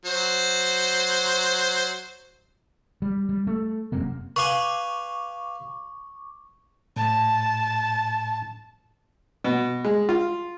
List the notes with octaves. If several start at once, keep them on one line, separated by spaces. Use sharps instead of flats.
F#3 C5
G3
G3
A3
E1 F#2 C3 A#3
B4 F5 G#5 C#6 D6
A2 A5
B2
G#3
F4